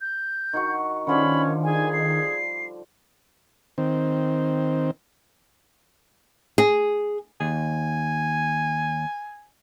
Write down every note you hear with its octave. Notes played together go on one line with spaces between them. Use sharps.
G6
D#3 F#4 C#6
D3 D#3 F3 G3 C#4 B5
G#4 G#5
C7
D#3 C4
G#4
D#2 G#5